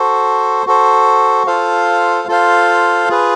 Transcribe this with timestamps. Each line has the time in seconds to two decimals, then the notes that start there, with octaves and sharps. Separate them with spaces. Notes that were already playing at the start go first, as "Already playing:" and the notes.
Already playing: F#4 A4 C5
0.66 F#4 A4 C5
1.47 F4 A4 C5 F5
2.28 F4 A4 C5 F5
3.08 F4 G#4 B4